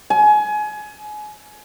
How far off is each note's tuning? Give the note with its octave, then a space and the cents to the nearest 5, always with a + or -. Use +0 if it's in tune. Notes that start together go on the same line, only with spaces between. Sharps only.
G#5 +25